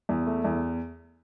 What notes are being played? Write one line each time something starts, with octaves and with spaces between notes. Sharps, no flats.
E2
A3
E2